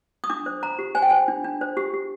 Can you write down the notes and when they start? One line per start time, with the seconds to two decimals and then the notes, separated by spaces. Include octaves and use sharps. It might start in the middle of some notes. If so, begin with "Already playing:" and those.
0.24 D#6
0.30 D4 D6
0.46 C5
0.63 C5 A#5
0.79 G4
0.95 C5 G#5
1.02 G5
1.10 C5 G#5
1.28 D4
1.44 D4
1.61 C5
1.77 G4
1.94 G4